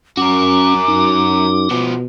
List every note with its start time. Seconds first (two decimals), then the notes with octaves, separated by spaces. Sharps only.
0.17 F#2 C#4 F#4 A#4 D6
0.88 F#2 D#4
1.71 B2 F3 B3